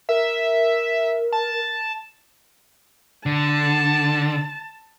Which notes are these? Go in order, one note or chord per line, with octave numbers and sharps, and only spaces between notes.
A#4 E5
A5
D3 A5